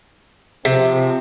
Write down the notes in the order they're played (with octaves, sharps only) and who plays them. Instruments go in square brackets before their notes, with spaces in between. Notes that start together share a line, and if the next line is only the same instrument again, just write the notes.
[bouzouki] C3 [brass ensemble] F3 C4